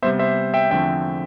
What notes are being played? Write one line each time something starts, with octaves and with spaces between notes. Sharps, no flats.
C3 G3 B3 C5 E5
C5 E5
E5 G5
E2 D3 F3 A3 C4 E5 G5